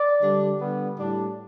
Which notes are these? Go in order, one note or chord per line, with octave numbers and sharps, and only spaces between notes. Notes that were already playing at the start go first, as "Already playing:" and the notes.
Already playing: D5
D3 G3 D4
D3 G3 B3
A2 G3 D4